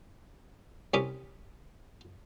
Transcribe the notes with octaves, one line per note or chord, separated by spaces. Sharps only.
C2 C#4 B5 D6 D#6